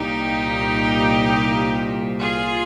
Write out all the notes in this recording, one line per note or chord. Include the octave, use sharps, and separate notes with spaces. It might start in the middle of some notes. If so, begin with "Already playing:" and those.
Already playing: C2 A#2 D#4 G4
F4 G#4